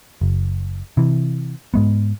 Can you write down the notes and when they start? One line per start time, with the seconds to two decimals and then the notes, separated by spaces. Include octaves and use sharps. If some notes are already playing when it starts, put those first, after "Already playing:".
0.21 F#1
0.97 C3 E3
1.74 G#2 G#3 B3